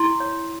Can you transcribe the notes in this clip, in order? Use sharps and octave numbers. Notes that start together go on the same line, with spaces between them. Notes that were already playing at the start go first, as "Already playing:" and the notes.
Already playing: E4 C6
C#5